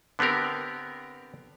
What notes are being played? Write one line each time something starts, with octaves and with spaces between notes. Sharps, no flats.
D3 B3 C4 G4 A#4